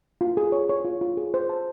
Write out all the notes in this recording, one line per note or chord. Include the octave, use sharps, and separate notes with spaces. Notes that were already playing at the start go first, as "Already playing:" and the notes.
F4
G#4
C#5
C#5
F4
F4
G#4
C5
A5